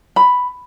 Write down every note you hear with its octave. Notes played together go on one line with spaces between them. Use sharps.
B5